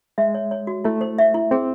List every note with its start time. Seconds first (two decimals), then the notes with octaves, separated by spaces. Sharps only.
0.18 G#3 E5
0.34 C#5
0.51 C#5
0.67 F#4
0.84 A3 E4
1.01 C5
1.18 E5
1.34 E4
1.51 C4 G#4